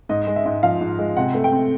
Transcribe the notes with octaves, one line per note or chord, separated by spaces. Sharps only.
G#2 D#5
G#3
E5
G#2
F3 F5
G#2
G#3
C3 F#5
A3
G5
C4